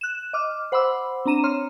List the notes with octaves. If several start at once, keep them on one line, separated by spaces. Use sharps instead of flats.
F#6 E7
D#5 D6 F6
C5 F#5 B5 C6 D6 E6
C4 D4 A#5 D#7 E7
C#5 C6 F6